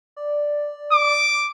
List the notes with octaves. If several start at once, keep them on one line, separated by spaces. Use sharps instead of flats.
D5
D6